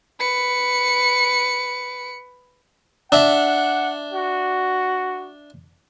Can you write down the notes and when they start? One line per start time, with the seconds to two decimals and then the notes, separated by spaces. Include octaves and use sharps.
0.20 B4 C#7
3.12 D4 E5 F#5
4.13 F#4